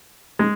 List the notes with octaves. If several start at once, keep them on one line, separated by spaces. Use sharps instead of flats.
G#3